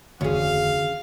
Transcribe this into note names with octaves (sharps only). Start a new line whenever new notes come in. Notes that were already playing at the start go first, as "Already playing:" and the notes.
F1 D2 D#3 E3 C#4 G#4 F5